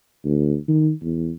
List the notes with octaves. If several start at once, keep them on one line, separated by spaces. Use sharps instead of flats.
D2
D#3
E2